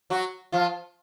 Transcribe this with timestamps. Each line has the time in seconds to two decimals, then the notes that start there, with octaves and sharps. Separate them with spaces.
0.10 F#3 F#4
0.52 F3 F4